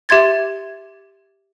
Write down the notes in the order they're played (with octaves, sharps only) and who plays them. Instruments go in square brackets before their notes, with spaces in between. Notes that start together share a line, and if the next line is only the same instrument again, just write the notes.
[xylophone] G4 E5 C6 G#6 A6